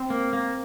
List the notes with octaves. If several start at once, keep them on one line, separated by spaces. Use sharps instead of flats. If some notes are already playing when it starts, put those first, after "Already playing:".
Already playing: C4
A#3
A#3